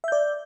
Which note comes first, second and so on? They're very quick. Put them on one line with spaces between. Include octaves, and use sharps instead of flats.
E5 G6 D5